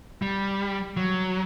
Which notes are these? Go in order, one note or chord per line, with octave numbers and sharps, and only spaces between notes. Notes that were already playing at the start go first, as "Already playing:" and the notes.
G3
F#3